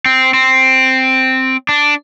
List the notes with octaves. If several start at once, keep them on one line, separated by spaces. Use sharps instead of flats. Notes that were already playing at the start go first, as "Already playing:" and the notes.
C4
C4
D4